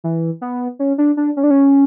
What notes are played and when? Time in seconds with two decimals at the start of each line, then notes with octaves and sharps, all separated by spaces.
0.04 E3
0.41 B3
0.79 C#4
0.98 D4
1.17 D4
1.37 C#4
1.43 D4
1.50 C#4